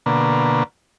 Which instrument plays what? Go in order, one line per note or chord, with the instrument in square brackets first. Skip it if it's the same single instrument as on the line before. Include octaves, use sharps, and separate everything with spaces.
[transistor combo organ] B2 D3 A#3